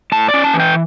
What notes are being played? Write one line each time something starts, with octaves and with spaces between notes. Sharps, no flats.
A2 A5
D5
C#4
A5
E3
G5